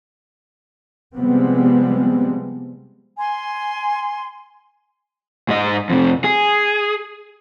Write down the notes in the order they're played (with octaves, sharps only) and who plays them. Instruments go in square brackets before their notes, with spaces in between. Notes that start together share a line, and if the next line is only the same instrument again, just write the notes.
[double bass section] C3 F3 G3 G#3 B3 C4
[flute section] G#5 C6
[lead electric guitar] G#2 D#5
F2 C3
G#4